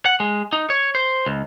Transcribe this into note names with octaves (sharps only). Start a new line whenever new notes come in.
F#5
G#3
D#4
C#5
C5
C#2